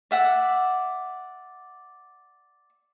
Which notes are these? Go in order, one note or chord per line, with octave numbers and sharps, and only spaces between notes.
D5 E5 F#5